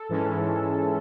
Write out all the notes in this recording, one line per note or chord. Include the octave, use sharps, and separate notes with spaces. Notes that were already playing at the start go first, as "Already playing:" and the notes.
Already playing: A4
G#2 E3 G#3 C#4